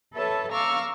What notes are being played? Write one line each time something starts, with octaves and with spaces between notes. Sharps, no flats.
A4 B4 C#5 E5 A5
F5 A#5 C#6 D6 E6 F6